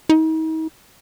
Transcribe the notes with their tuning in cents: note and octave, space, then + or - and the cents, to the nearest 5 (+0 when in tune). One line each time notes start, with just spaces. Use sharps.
D#4 +40